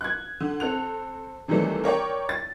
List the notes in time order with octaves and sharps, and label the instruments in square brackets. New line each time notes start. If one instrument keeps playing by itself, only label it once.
[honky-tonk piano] F#6 G#6
D3
C4 A4 F#6 F7
C3 D#3 E3 F#3 G3 A3
A#4 C#5 D5 G5
A6